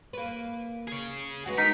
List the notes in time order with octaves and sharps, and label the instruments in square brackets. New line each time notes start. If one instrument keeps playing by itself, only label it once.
[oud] A#3 B4
[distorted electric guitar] G#4 C#5
[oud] G#3 B3 F#4
[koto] D#4 [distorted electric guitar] A#4 [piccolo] B6